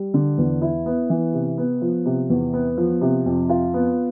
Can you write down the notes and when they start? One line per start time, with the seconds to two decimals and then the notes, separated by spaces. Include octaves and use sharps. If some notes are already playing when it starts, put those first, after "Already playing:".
Already playing: G3
0.14 D3
0.38 E2
0.62 E4
0.86 B3
1.10 E3
1.34 C3
1.58 B3
1.82 F3
2.06 C3
2.30 E2
2.53 B3
2.77 F3
3.01 C3
3.26 F2
3.49 F4
3.74 B3